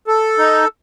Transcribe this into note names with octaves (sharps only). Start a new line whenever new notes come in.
A4
D#4